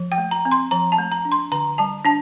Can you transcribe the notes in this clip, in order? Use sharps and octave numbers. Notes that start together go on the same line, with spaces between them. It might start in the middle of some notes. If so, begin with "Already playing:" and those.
Already playing: F3
G5
A3
A#5
C4
C6
F3 A#5
A5
A3
A#5
D4
C6
D3 A#5
G3 A5
D4 A5